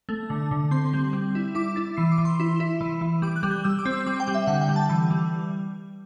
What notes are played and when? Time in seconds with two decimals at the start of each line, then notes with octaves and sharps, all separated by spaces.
0.09 A3
0.30 D3
0.51 D3
0.71 C4 C6
0.93 G3
1.13 G3
1.35 E4
1.55 E4 D6
1.76 E4 A6
1.97 E3 C7
2.12 D6
2.18 E3
2.25 C6
2.40 E4
2.60 E4
2.81 E3
3.01 E3
3.22 G3 D6
3.36 F#6
3.43 G3
3.51 G6
3.64 G3 E6
3.79 D6
3.86 C4
3.93 E6
4.06 G3 D6
4.20 G5
4.28 G3
4.34 E5
4.47 D3 F#5
4.61 G5
4.69 G3
4.76 A5
4.89 E3
5.11 G3